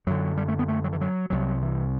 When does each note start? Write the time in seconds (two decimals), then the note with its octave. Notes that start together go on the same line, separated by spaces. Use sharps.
0.07 F#2 D3 F#3
0.37 G3
0.48 A3
0.59 B3
0.68 A3
0.84 F#3
0.93 E3
1.01 F#3
1.30 C2 C3 F#3
1.62 E3